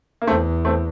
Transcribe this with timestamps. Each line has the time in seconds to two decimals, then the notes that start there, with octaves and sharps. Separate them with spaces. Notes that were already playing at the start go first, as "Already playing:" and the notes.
0.22 A#3
0.27 E2 A3 C4
0.65 A3 C4